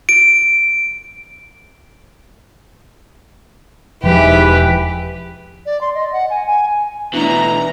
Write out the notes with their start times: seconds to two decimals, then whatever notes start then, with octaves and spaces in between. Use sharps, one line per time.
0.09 D7
4.03 E1 G#2 E3 F3 G4 B4
5.66 D5
5.81 C6
5.95 D#5
6.13 F#5
6.30 G#5
6.47 G#5
7.13 B2 E3 A3 D4 A#5